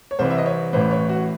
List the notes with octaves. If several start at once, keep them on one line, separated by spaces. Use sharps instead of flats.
C#5
C2 C3 E3 C4 C5
E5
D#5
C#5
A1 A2 E3 C5
C#5
F#4